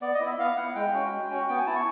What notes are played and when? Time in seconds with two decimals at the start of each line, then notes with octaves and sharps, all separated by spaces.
0.02 B3 D5
0.14 D#5
0.20 E4
0.26 E5
0.39 B3 F5
0.57 E4 F#5
0.75 G#3 G5
0.93 C#4 F#4
1.11 G#3
1.30 C#4 F#4
1.48 B3 G5
1.58 G#5
1.66 E4 A5
1.76 C#6